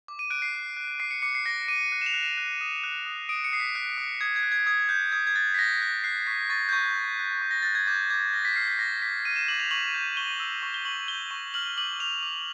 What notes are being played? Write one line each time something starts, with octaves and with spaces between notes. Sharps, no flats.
D6
D#7
F#6 D7
C7
F#6
F#6
D6 C7
C#7
D6 C#7
C7
F#6 A#6
D6 D#7
F#6
E7
F7
F#6
E7
F#6
D#6
F#6
D#6
D#6 D7
C#7
D#6 C7
B6
F#6
D#6
D#6 G#6
G#6
F#6
G#6
D#6 G#6
F#6 G6
D#6 G#6
G#6
F#6 A6
B6
F#6 A#6
F#6 A#6
F#6 C7
C#6 B6
C#6 A6
G6
C#6 G#6
F#6
F#6
C#6
A#6
F#6 A6
G#6
D6 G6
D6 G#6
F6 A#6
B6
F6 C7
B6
D6 A#6
D6 B6
F6 D#7
E7
D6 F#7
F7
C#6 F#7
G6
C#6 G7
E6
C#6
G7
C#6 F#7
G6 G7
C#6
F6 F#7
D6 F#7
F6 F7
D6